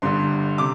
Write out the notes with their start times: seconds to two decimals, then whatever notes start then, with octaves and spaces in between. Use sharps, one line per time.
0.02 G1 G2 D3 C6
0.58 C3 D6